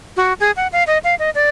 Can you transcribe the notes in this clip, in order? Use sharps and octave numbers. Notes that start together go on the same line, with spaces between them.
F#4
G#4
F#5
F5
D#5
F5
D#5
D5